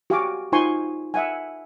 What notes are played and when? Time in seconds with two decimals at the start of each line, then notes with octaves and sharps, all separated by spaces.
0.10 F#4 G4 F5 G#5 C6 D6
0.52 D#4 F4 C5 G#5 C6 C#6
1.14 E5 F#5 G#5